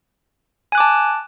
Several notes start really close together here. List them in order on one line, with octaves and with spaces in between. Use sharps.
G#5 F#6 D6 A5